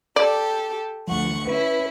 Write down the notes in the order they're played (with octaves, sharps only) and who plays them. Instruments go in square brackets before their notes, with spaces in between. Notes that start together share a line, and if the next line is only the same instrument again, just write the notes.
[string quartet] G4 A4 [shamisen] D5
[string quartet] D2 F#5 C#6 [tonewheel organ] F3
[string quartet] C#4 E4 [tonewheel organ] B4